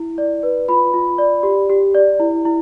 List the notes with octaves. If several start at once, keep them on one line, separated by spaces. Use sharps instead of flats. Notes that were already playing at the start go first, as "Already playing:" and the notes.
Already playing: E4
D5
B4
F4 B5
F4
D5
G4
G4
D5
E4
E4